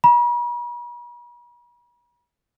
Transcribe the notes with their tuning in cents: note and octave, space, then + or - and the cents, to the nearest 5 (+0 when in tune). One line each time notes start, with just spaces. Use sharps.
B5 -45